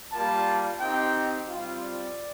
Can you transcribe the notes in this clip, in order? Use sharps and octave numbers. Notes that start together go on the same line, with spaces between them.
G3 A#3 F4 A5
C4 D#4 G4 G5
G3 C4 F4
D5